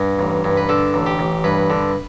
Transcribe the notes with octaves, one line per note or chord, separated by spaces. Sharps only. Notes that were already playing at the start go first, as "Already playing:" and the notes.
Already playing: G2
A1
G2
B4
D3 A4
A1
G4
A1
G2 B4
D3